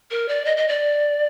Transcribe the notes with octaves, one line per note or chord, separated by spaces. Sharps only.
A#4
D5
D#5
D#5
D5